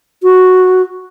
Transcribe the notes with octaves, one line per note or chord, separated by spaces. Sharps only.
F#4